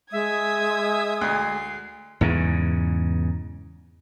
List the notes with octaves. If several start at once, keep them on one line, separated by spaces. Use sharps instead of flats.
G#3 E5 D#6 G#6
D2 C7
E2 G#2 C#3